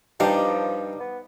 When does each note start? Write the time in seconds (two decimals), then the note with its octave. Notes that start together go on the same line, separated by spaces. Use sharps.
0.20 G2 F3 G3 D#4 G4 F5
1.00 B3